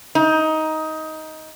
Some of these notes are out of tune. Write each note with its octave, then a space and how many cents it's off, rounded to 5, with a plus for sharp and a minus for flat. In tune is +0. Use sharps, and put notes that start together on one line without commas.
D#4 +15